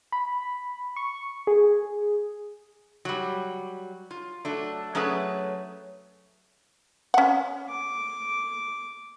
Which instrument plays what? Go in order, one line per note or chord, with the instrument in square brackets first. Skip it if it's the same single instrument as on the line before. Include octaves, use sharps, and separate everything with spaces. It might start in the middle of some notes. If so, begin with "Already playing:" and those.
[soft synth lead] B5
C#6
G#4
[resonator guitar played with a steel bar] F#3 G3
F4
F#3 A3 D4
F#3 A3 C#4 G#4 B4
[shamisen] C#4 F#5
[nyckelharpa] D6